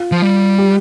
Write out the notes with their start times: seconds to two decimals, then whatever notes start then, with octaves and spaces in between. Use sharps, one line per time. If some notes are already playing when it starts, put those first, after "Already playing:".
Already playing: F4
0.12 F3
0.22 G3
0.58 G4